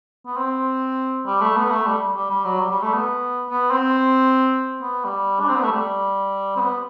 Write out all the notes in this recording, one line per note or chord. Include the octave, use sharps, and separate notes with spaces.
B3
C4
G3
A3
B3
A3
G3
G3
G3
F#3
G3
G3
A3
B3
B3
C4
B3
G3
D4
C4
B3
A3
G3
C4
B3